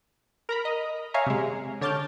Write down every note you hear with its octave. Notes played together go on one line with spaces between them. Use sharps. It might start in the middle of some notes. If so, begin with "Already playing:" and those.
A#4 A#5 B5
D#5
C#5 E5 F5 G#5 A#5
C3 G#3
D3 C#5 A5 D6 F6 G6